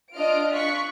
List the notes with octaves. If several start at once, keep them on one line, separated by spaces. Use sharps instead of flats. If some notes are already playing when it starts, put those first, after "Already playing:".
D4 F4 D#5 F6 D7
F4 C#6 F#6 B6